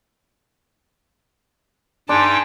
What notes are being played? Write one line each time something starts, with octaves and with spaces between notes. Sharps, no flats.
G2 D4 D#4 G#4 G5 A5 C6